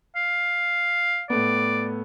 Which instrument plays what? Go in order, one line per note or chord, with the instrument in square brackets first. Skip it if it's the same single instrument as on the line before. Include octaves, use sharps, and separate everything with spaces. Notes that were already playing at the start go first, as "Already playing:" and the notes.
[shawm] F5
[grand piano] A2 A3 B3 [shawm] D5